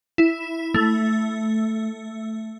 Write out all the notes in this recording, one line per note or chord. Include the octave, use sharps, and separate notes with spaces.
E4
A3